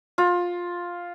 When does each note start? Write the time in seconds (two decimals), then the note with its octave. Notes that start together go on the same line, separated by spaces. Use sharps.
0.18 F4